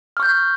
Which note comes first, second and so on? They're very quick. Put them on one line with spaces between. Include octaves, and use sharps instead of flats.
F6 C#6 G6